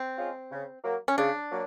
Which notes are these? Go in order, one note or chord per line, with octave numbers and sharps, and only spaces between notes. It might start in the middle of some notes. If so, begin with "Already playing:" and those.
Already playing: C4
G#3 C#4 F4
C#3
F#3 A#3
C#4
C#3 D4
F#3 A#3